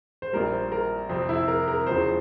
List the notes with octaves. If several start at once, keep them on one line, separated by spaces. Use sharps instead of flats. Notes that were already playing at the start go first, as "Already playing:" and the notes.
C5
A#1 A#2 G3 A#4
C5
A#4
F2 C3 F3 C4
E4
A#4
A#4
E1 E2 C#3 F3 C5